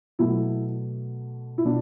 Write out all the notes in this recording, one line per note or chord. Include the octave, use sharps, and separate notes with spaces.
B2 F#3 A3 E4
E4
B2 D4